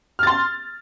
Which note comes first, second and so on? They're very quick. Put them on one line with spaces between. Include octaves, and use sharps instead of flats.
F6 A6 C6